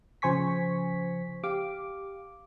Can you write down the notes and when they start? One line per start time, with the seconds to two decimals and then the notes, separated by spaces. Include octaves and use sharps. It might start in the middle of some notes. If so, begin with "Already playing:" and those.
0.22 C#3 F3 C5 G#5 C#6 B6
1.44 G4 F5 D6